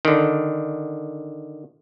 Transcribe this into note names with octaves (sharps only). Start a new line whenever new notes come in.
D3 D#3